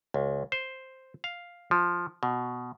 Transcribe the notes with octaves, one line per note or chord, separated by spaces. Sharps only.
C#2
C5
F5
F3
B2